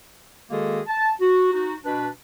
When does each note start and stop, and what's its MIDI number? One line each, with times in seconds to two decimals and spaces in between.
0.50 0.80 51
0.50 0.80 56
0.50 0.80 58
0.50 0.80 66
0.50 0.80 68
0.50 0.80 69
0.87 1.11 81
1.20 1.52 66
1.52 1.74 63
1.52 1.74 66
1.84 2.08 47
1.84 2.08 62
1.84 2.08 71